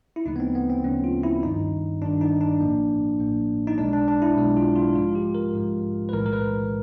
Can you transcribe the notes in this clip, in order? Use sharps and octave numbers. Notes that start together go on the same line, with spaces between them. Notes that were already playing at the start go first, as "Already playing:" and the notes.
E4
D2 C#3 F3 A3 D#4
B3
C4
B3
C4
D2 C#3 F3 A3 C#4
F4
E4
G1 G2 D#3 D#4
G1 G2 D#3 D4
D#4
D4
A1 A2 F3 A#3
A1 A2 F3 A#3
D#4
B1 B2 G#3 D4
D4
D4
E4
B1 B2 G#3
F4
F4
G#2 F3 G#3 F4
G4
A#4
G#2 F3 G#3
B4
B1 A2 E3 G#3 A#4
A#4
B4